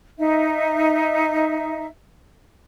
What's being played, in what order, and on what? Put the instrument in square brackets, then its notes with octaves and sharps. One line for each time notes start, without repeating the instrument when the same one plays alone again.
[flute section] D#4 E5